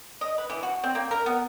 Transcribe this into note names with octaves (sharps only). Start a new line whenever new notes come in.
D#5
B4
E3
F#4
C4
A#3
A#4
B3